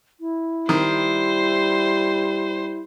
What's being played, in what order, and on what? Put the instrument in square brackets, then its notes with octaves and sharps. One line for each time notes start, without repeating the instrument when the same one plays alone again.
[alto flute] E4
[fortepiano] D#3 [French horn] G3 [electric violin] C5